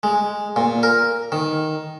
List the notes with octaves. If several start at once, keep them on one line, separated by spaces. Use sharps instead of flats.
G#3
A#2
A#4
D#3